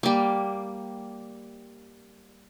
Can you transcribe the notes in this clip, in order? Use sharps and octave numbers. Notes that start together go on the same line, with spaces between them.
G3 A#3